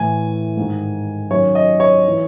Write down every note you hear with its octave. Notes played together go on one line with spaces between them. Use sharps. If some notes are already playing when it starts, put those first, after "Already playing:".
Already playing: A2 E3 G#5
G#2 D#3
F#2 D#3 C#5
D#5
C#5
E3